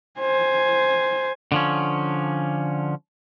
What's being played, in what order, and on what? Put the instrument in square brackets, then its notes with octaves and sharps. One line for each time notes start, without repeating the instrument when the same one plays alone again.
[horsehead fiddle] C5 G#5
[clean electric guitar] D3 F3 C#4